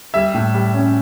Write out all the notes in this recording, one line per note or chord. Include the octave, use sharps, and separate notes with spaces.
G3 E5
A2
G3
C#4